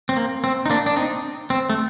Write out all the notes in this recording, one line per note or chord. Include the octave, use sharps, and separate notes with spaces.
C4
A#3
C4
D#4
A#3 D4
D4
C4 D#4
C4
A3